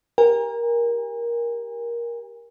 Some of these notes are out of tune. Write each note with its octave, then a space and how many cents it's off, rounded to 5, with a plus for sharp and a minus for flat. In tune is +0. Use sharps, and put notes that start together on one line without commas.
G4 +0 A#4 +15 G#5 -40